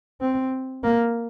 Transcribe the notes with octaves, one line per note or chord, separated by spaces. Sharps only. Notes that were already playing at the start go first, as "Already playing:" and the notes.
C4
A#3